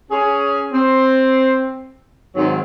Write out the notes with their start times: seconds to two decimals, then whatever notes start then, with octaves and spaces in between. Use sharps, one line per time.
0.10 C#4 G#4
0.72 C4
2.35 G#2 D#3 F#3 C4